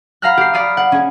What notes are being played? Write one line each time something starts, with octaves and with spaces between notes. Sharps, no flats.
F5 F#5 A#5 B5 F6 F#6
G4 C7
D5 F5 B5 D#6
F#5
C#4 G#4